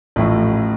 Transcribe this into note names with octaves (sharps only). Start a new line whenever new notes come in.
A1 A2 F3 A3